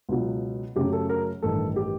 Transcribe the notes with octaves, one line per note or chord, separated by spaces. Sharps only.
C#2 B2 F#3
F#2 C#3 F#3 A3 G4
A4
A#4
A1 G2 D#3 A4
G4